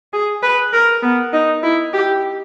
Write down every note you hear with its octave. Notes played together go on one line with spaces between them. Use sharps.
G#4
B4
A#4
B3
D#4
E4
G4